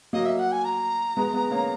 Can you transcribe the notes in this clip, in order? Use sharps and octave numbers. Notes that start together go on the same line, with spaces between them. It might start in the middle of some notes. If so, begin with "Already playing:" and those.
F#3 A#3 D#5
E5
F#5
G#5
A#5
G#3 B3
G#3 B3
A#3 C#4